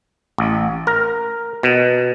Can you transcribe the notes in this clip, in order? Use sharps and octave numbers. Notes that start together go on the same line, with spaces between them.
A1
A#4
B2